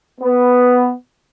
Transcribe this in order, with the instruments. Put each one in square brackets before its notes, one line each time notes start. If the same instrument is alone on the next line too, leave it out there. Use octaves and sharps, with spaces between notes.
[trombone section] B3